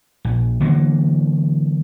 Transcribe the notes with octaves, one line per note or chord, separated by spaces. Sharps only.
A#1
D3 E3 F#3 A#3